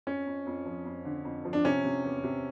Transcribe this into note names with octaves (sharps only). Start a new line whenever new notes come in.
F2 C#4
F2
F2
F3
F2
D3
F2
F3
D4
C3 C#4
C3
E2
C3